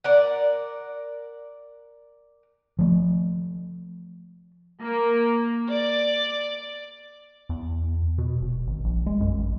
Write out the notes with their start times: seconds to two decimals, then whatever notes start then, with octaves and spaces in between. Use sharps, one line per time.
0.04 A#4 D5 F#5
2.79 F3 A3
4.82 A#3
5.71 D5
7.49 E2
8.18 B2
8.41 D#1
8.67 G#1
8.84 A#1
9.06 G#3
9.20 F#2
9.38 A1